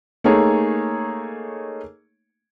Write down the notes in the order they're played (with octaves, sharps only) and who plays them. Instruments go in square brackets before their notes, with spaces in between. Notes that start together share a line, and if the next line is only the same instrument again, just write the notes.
[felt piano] A3 A#3 D#4 G#4 C#5